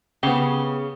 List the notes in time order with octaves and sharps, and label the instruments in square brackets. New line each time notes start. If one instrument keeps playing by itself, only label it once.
[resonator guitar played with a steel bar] C#3 [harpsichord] B3 G4